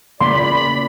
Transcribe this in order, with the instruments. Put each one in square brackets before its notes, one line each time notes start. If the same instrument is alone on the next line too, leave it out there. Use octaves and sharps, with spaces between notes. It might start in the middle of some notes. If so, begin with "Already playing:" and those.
[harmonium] E2 A#2 D5 [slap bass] C#3 A#3 B3 [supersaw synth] B5 [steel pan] C6